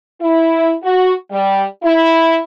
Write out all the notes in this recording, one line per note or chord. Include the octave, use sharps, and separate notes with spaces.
E4
F#4
G3
E4